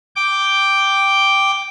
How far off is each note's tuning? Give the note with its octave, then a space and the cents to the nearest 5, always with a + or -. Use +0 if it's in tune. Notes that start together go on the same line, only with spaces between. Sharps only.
G5 +0 D6 +0